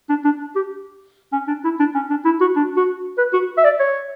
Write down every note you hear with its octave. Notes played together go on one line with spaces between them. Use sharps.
D4
D4
G4
C#4
D4
E4
D4
C#4
D4
E4
F#4
D4
F#4
B4
F#4
E5
D5
C#5